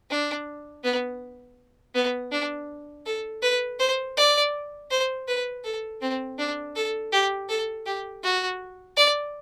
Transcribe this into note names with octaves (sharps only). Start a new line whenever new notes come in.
D4
B3
B3
D4
A4
B4
C5
D5
C5
B4
A4
C4
D4
A4
G4
A4
G4
F#4
D5